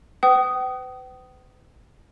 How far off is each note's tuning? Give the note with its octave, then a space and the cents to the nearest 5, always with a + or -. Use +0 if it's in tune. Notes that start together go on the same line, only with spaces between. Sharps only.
B4 +40 G5 -40 D#6 +0